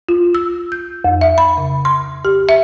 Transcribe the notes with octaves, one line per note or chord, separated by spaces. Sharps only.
F4
E6
G6
F2
E5
B5
C#3
C6
G4
E5